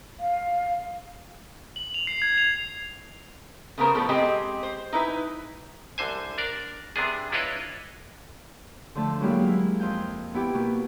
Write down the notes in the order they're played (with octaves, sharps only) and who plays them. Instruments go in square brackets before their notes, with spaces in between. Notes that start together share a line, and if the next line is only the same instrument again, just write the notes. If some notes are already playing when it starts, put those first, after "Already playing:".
[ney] F5
[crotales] F#7
F7
C7
G#6
F7
[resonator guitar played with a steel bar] C#3 A3 B3 G#4 A#4 C5
A2 F3 G3 B3 A4
G#3 C4 G4 G#4 D#5
C5
D#4 E4 B4 G#5
[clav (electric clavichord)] C2 D3 C5 G#5
D4 A#4 D5
C3 B3 D4 G#4
D4 E4 F4 B4 C#5 D#5
[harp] D3 F3 A3 A4
F#3 G#3 A#3 E4 G4 F5
E4
F2 D#5 F5 G6
B3 E4 G4
B2 A#3